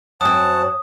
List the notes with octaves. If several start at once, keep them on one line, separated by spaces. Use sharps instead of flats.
F#2 C4 C#5 F#5 A5 D#6